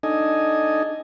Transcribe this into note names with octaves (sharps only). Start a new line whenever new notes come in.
D4 D#4 A4 D#5 G#5